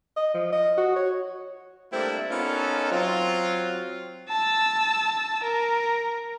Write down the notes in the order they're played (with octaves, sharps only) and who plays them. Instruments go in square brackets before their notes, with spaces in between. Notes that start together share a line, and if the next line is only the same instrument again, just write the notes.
[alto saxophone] D#5
F3
D#5
F#4
C#5
[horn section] G3 A3 A#3 C4 D4 E4
B3 C#4 D#4 F4 A4 A#4
F#3 C4 F4
[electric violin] A5 E6
A#4